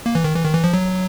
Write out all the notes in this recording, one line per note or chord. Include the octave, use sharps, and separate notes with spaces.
A#3
E3
D#3
E3
D#3
E3
F3
F#3